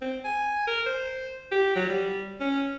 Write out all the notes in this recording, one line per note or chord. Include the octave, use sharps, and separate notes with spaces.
C4
G#5
A#4
C5
G4
F#3
G3
C#4